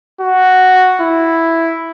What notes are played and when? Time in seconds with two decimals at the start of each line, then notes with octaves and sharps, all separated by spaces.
0.21 F#4
1.01 E4